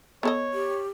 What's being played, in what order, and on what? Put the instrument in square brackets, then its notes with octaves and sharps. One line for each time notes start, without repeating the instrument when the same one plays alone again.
[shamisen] B3 A4 D#5 [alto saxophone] C#5
[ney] G4